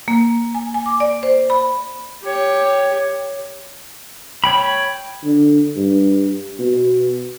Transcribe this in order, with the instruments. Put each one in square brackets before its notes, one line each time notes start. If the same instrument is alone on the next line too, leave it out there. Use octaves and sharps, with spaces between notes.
[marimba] A#3
G#5
G#5
D6
D5
C5
B5
[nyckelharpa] G4 C#5
[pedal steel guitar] C#5 G5 B5
[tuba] D3
G2
B2